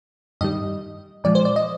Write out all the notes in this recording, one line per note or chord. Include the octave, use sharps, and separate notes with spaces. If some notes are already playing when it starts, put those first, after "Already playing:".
G2 D#3 G3 D#5
A#2 F3 G#3 D5
C5
D5
D#5